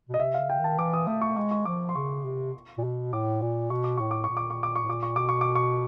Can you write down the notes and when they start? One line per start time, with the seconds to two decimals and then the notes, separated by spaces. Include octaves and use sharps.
0.09 B2
0.14 D#5
0.19 C3 E5
0.34 C#3 F5
0.50 G5
0.59 D#3 A5
0.78 E3 D6
0.93 D#6
1.07 A3 D#6
1.22 C#6
1.36 G#3 C#6
1.51 C#6
1.65 F3 D6
1.89 C6
1.95 C#3 C#6
2.25 C3
2.77 A#2
2.84 B2
3.13 A2 D6
3.42 A#2
3.70 B2 C#6
3.84 D6
3.97 A2 C#6
4.11 D6
4.24 C#6
4.29 A#2
4.37 D6
4.50 C#6
4.63 D6
4.76 C#6
4.83 A2
4.88 A#2 D6
5.03 C#6
5.16 B2 D6
5.29 C#6
5.41 D6
5.55 C#6